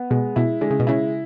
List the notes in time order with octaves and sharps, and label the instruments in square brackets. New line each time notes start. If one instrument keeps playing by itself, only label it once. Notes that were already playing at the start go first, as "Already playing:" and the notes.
Already playing: [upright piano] B3
[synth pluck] B2 [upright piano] G#3
[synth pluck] B2 [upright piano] E4
[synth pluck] D3 [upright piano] G#3
[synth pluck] C#3
B2
[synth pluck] C#3 [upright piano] E4